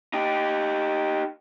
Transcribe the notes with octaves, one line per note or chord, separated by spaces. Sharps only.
D#4 G4